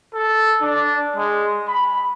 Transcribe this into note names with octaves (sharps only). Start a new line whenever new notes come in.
A4
D4
G#3
B5